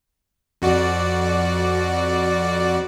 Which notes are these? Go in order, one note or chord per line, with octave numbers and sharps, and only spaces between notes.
F2 F#4 D5